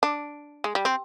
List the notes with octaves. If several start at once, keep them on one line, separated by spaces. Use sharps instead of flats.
D4
G#3
G3
C4